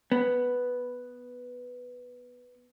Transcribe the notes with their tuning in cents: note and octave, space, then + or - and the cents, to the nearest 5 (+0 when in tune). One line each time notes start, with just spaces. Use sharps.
B3 +0